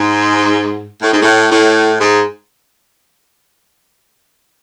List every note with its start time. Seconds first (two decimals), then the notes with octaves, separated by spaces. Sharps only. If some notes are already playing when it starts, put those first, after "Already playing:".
Already playing: G#2
1.01 A2
1.12 G#2
1.22 A2
1.50 A2
2.00 G#2